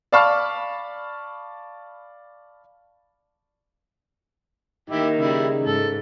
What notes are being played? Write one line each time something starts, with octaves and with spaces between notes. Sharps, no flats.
D5 F5 A5 B5 C#6 F6
D#3 A#3 D#4 E4 G4
C#3 G3 E4
G#2 A4